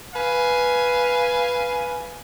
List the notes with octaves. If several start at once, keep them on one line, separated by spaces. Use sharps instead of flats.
B4 F5 G#5